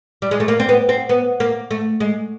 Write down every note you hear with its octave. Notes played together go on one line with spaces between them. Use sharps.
G3
G#3
A3
A#3
C4
B3
C4
B3
A#3
A3
G#3